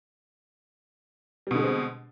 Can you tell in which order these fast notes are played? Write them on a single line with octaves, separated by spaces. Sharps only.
G3 B2 D3 G#3 C4